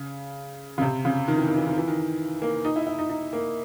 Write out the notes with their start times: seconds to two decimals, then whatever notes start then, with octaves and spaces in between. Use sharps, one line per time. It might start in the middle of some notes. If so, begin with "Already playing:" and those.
Already playing: C#3
0.78 C#3
0.82 C3
1.05 C#3
1.28 D#3
1.37 E3
1.48 D#3
1.57 E3
1.67 D#3
1.78 E3
1.88 D#3
2.42 A#3
2.65 D#4
2.76 E4
2.87 E4
2.99 D#4
3.09 D#4
3.33 A#3